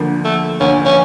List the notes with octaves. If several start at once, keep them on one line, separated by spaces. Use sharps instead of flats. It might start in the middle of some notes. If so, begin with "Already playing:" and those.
Already playing: D2 D3 F3 A#3
A3
D2 D3 F3 A#3 C#4
C#4